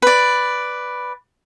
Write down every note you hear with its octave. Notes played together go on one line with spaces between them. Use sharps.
B4 D5